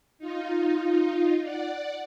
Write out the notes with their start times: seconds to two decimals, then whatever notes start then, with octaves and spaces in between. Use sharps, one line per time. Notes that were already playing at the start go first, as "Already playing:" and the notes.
0.19 D#4 F4
1.43 D5 F#5